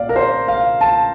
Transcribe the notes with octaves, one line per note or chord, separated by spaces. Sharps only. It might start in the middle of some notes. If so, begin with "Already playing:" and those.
Already playing: A#2 D5 F5
A#4
C5
F5
A5